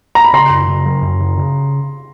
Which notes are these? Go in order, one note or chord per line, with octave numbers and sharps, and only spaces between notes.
A#5
B5
C#3 A#5 C6
F#2
C#3
F#3
F#2
C#3
C#3